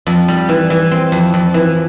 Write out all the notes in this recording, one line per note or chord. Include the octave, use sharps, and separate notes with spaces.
F2
G3
E3
E3
C4
F2
F2
E3